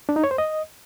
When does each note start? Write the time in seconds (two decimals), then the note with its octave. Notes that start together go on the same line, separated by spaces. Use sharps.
0.09 D4
0.16 D#4
0.24 C#5
0.31 C5
0.38 D#5